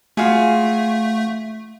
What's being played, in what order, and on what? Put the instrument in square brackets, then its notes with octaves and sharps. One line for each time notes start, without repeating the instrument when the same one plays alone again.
[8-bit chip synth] A3 [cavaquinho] F4 F#4 G#4